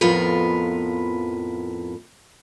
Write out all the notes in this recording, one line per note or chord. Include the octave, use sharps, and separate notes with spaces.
F2 A2 B3 F4 A#4 B4